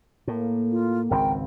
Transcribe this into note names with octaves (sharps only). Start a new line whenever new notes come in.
A2 A#3
F4
G#1 C#2 C4 A#4 G5